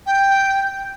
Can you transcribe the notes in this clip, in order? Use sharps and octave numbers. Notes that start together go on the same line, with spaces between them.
G5